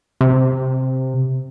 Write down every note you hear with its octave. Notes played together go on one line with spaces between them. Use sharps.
C3